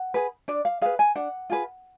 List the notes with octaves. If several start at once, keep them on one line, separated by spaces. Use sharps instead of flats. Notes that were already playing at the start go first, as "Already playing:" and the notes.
Already playing: F#5
G#4 B4
D4 D5
F5
G#4 B4 F5
G#5
D4 F#5
F4 G#4 B4